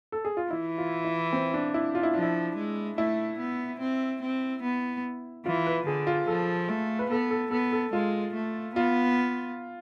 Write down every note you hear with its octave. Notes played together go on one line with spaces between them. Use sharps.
A4
G#4
F4
E3 E4
F4
E4
C4
D4
E4
F4
E4
F3 D4
E4
G#3
A3 E4
B3
C4
C4
B3
E3 F4
B4
D3 G#4
F4
F3 A4
A3
B4
B3 A4
A4
B3 A4
A4
G#3 F4
A3
B3 F4